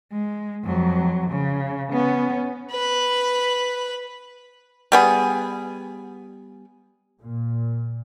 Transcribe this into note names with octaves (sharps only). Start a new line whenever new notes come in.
G#3
F2 F#3
C#3
B3 C#4
B4 B5
G3 B3 G#4
A#2